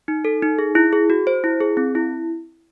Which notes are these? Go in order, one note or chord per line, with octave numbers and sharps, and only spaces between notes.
D#4
A4
D#4
G#4
E4
G#4
F#4
C5
E4
G#4
C4
E4